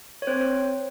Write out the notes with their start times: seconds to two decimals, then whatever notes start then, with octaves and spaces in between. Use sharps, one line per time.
0.22 C#5
0.27 C4 C5